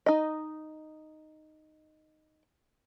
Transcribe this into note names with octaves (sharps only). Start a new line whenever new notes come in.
D#4 D#5